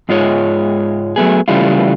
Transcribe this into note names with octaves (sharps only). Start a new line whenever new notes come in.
G#2 G#3 F4 G#4 C#5
F#3 A3 B3 G#4
C#3 E3 G3 A3 E4 F4